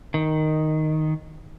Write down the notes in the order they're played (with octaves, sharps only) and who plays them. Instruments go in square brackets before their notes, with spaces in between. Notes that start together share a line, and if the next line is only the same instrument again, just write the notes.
[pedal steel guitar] D#3